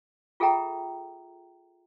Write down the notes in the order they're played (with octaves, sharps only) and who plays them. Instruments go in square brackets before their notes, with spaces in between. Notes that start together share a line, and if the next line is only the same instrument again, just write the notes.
[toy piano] F4 G#4 A4 E5 G5 A#5